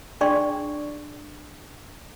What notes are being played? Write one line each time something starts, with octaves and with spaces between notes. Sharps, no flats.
D4 G#4 D5 G5 C6 C#6